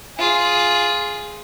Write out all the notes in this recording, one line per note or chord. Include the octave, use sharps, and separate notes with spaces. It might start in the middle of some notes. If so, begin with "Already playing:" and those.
F4 G#4